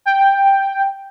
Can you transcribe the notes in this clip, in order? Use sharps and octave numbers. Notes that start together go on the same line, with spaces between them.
G5